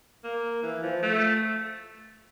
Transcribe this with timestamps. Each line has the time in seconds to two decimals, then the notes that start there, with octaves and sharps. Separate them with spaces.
0.24 A#3
0.63 E3
0.83 F3
1.03 A3